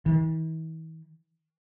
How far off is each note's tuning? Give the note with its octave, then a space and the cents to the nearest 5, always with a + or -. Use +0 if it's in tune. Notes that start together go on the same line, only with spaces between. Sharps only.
E3 -45